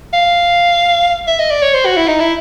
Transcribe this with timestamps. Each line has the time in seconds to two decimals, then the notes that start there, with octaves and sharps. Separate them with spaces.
0.13 F5
1.27 E5
1.39 D#5
1.51 D5
1.62 C#5
1.74 C5
1.85 F#4
1.97 E4
2.08 D#4
2.20 E4